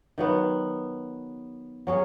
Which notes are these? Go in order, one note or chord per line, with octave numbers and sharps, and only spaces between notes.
D#3 F#3 B3
F#3 C#4 G#4